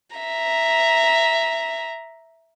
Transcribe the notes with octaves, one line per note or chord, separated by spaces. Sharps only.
E5 A#5